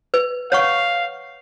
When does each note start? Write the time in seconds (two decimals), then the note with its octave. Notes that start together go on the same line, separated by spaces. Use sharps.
0.14 B4
0.52 C#5 F5 F#5 C#6